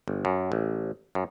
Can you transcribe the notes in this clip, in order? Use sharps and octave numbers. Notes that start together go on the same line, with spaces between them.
G1
F#2
A1
F#2